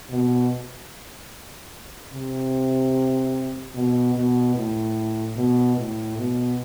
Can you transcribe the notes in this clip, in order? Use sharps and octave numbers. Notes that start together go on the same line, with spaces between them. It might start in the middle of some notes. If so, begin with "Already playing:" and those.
B2
C3
B2
B2
A2
B2
A2
B2